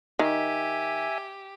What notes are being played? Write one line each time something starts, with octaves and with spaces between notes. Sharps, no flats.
D#3 G4 E5 G#5